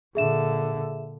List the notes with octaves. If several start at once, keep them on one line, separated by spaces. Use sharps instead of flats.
A#2 D3 G#4 E5 E7